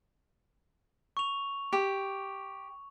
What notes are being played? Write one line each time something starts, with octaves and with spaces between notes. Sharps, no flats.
C#6 F7
G4